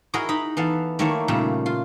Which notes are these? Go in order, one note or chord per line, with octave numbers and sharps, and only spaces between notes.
E4 F#4 G#4 A#4 D#5
D#4 B5
E3 B3 A4 F5
D#3 A3 A#3 E4 A4 C#5
A#2 C#3 G3 A3
F4